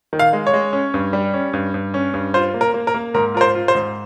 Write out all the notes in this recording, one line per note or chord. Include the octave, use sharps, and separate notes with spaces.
D#3
F5
G#3
C#5
G#3
C#4
G2
G3
C#4
G2
G2
C#4
G2
F4 C5
A#3
A#4
A#3
A#4
A#3
G#2 A#4
F4 A#4
C5
F4
C5
G#2